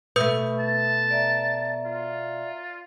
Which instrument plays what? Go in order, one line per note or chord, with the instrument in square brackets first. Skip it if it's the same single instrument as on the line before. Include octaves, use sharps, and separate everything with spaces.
[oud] B2 A3 [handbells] B4 D#6 G6 [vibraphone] E5
[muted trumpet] A5
[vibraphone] D5 E5 A#5
[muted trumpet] F4